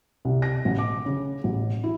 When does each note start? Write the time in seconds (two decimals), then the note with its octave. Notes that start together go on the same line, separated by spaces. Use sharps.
0.25 C2
0.42 A#6
0.65 A1
0.78 D6
1.06 C#3
1.44 A1
1.84 E4